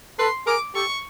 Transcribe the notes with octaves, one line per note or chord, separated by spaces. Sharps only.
A4 B4 C6
G#4 A#4 D6
G4 A4 C#6